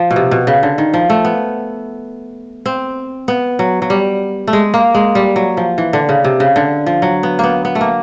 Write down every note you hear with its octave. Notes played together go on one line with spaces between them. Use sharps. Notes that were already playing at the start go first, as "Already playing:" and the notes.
Already playing: F3
B2
C3
B2
C#3
D3
D#3
F3
A3
B3
C4
B3
F#3
F#3
G3
A3
G#3
A#3
G#3
G3
F#3
F3
E3
D3
C#3
C3
C#3
D3
F3
F#3
B3
A#3 B3
B3
A3
A#3